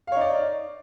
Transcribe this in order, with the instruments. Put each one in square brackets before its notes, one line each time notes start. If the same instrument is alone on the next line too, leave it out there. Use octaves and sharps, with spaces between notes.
[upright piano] F5
C#5
D#4
D5